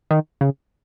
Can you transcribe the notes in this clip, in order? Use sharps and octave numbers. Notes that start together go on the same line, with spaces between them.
D#3
C#3